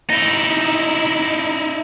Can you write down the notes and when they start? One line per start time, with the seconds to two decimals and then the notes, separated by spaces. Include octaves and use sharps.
0.10 D#4 E4